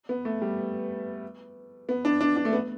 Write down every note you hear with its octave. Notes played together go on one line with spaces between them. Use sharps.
B3
A3
G3
B3
D4
D4
D4
A3
B3